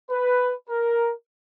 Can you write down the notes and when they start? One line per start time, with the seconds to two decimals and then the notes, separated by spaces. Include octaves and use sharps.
0.11 B4
0.70 A#4